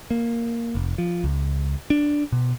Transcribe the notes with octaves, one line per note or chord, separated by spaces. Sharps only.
A#3
F1
F3
C#2
D4
B2